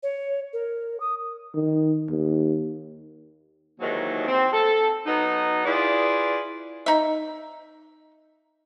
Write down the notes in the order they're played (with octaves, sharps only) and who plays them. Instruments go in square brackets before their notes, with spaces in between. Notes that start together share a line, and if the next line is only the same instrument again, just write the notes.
[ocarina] C#5
A#4
D#6
[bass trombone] D#3
D#2
[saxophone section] D#2 G#2 D#3 E3 F#3
C4
A4
F#3 B3 D#4
E4 F4 G#4 B4 D5
[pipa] D#4 E5